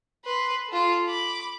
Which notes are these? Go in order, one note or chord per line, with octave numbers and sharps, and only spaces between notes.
B4 C6
F4 A4
B5 D6